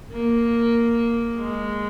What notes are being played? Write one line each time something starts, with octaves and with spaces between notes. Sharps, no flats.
A#3
G#3